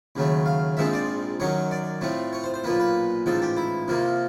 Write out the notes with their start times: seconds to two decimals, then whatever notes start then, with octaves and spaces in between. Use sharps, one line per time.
0.16 D#2 C#3 F#3 A3
0.46 F5
0.77 A#1 G#2 F3 G#3 C4 E5
0.93 D5
1.40 F#2 D#3 F#3 C#5
1.71 D5
2.01 A2 F3 A3 C4
2.33 C#5
2.44 C5
2.54 C5
2.64 B1 A#2 F3 A#3 B4
2.80 B4
3.26 A1 G#2 F3 A4
3.42 G4
3.57 E4
3.88 F2 C3 F3 A#3